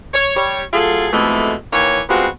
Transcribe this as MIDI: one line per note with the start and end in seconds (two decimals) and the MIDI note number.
0.14 0.33 73
0.36 0.63 55
0.36 0.63 73
0.73 1.08 54
0.73 1.08 57
0.73 1.08 65
0.73 1.08 68
0.73 1.08 69
1.12 1.53 41
1.12 1.53 47
1.12 1.53 52
1.12 1.53 56
1.12 1.53 57
1.73 2.01 39
1.73 2.01 52
1.73 2.01 58
1.73 2.01 73
2.09 2.27 55
2.09 2.27 56
2.09 2.27 59
2.09 2.27 60
2.09 2.27 65
2.09 2.27 66